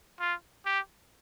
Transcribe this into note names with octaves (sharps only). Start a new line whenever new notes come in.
F4
G4